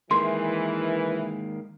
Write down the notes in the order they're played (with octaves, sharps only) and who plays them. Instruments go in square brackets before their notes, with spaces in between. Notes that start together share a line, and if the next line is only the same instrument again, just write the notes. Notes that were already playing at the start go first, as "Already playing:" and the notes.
[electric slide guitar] D#3 G#3 A#3 [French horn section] E3 [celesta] C6